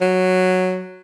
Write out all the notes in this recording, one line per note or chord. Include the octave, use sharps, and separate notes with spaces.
F#3